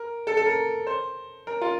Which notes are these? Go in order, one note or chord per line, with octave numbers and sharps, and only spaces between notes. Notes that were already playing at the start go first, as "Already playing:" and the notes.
Already playing: A#4
A4
A4
A#4
C5
A#4
F4